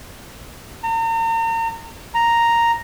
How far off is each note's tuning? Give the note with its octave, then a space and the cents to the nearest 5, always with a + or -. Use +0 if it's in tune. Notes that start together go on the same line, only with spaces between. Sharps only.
A#5 -40
A#5 +0